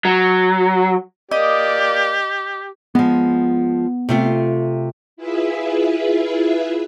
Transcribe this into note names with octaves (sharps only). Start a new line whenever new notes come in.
F#3
A#3 G4 D5 D#5
F3 G#3 B3
C3 A3 F4
E4 F4 G#4 B4 E5